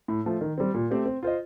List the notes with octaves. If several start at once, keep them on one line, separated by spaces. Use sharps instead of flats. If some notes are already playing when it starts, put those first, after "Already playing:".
A2
F3 A3
D#3
G3 C4
A#2
A3 C4 G4 C5
C4
F4 C5 D#5